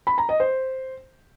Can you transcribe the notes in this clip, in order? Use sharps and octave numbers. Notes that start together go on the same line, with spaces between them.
B5
A#5
D#5
C5